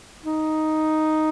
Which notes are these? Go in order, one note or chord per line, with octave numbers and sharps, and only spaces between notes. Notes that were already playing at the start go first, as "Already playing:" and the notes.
D#4